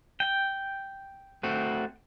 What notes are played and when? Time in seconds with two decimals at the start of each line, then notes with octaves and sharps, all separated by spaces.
0.20 G5
1.43 A3 C4 F#4